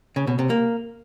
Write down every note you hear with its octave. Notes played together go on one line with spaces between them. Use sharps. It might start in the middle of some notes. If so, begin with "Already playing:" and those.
C#3
B2
C3
A#3